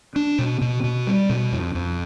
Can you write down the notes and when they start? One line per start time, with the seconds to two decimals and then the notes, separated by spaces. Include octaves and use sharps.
0.16 D4
0.39 B2
0.61 B2
0.84 B2
1.07 G3
1.30 B2
1.52 F2
1.75 F2